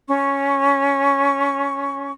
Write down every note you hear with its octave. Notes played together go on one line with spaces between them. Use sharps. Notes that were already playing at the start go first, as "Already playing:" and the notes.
C#4 C#6